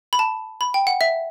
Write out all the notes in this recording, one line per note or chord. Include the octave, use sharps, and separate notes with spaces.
B5
A5
B5
G5
F#5
E5